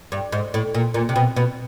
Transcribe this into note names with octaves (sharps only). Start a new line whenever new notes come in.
G2
G#2
A2
A#2
A#2
C3
B2
B2